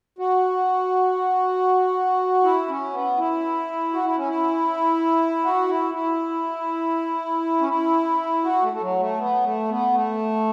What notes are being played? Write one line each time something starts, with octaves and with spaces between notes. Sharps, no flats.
F#4
E4
C#4
B3
E4
F#4
E4
C#4
E4
F#4
E4
E4
C#4
E4
F#4
A3
A3
F#3
A3
B3
A3
B3
A3